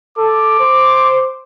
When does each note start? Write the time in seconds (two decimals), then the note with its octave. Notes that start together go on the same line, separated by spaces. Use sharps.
0.18 A4 D6
0.60 C5